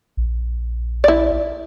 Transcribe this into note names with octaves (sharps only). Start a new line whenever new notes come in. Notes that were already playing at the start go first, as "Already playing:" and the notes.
A#1
E4 D5